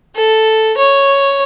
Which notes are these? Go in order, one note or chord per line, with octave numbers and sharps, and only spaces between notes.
A4
C#5